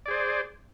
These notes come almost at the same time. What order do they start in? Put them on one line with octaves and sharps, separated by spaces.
D5 G#4 C5